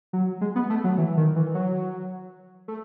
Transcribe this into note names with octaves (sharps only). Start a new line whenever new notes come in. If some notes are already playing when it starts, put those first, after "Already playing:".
F#3
G#3
B3
A3
F#3
E3
D#3
E3
F#3
A3